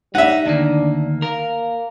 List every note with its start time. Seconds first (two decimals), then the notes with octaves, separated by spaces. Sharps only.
0.15 G3 D#4 E5 F#5
0.45 D2 D#3 A#3 D4
1.22 A#3 A#4